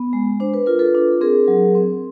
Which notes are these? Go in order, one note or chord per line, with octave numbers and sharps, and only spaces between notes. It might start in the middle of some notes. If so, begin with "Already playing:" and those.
Already playing: B3
G#3
D4 C5
B4
F4 A#4
A4 B4
D4
C4 G#4 A#4
F#3
C4